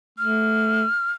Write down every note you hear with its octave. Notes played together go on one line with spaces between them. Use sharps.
A3 F6